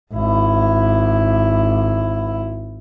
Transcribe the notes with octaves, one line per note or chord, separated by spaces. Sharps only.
G#1 E4